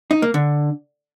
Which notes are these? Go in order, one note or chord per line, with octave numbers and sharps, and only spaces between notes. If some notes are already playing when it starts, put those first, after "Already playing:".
D#4
A#3
D3